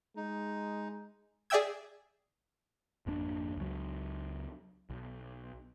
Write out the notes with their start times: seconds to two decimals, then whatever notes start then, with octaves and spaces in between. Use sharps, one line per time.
0.16 G#3 D#4
1.50 G#4 D5 E5 G5 E6 G#6
3.06 G#1 F2 A#3 D4
3.57 C#2 F#3
4.90 B1